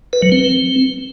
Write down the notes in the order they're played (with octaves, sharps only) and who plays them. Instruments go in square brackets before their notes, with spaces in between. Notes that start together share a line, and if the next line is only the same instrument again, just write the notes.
[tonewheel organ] B4
F#3
C4